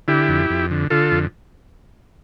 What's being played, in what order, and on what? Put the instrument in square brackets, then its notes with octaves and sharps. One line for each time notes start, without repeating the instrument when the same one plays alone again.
[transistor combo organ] D3 E4 G4
F2
F2
D3
D3 F4 A4
F2